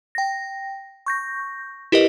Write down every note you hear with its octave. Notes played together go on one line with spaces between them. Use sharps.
G5 A#6
C#6 G6 A#6
E4 G4 A#4 B4 D#5